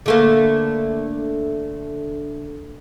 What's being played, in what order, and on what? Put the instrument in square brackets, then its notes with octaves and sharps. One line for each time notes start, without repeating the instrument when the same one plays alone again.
[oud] D3 A3 A#3